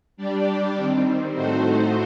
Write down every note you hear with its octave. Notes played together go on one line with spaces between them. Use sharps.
G3 D4 G4 D5
D#3 G3 C4
A2 A3 D#4 F#4 C5